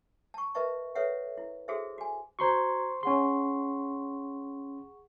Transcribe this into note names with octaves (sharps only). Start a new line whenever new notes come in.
A5 C#6
A#4 B4 D#5 E5 A5 C#6
A4 B4 C#5 E5 F#5
E4
F#4 G#4 A4 C5 E5
F#4 G#5
F#4 C5 A#5 C6 C#6 G#6
C#4 G#4 F#5 C6 C#6